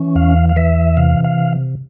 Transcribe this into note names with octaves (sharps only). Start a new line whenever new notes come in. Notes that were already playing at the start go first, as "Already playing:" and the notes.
Already playing: E3 C#4
E2 F5
F5
E3 E5
C3 F5
F5